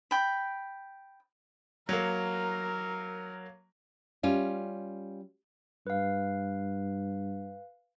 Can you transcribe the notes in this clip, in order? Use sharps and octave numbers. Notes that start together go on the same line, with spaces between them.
G5 B5
F#3 A#3 A#4
G3 C#4 F4
G2 B4 F5